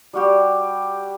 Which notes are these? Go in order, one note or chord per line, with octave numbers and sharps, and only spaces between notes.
G3 F#4 G4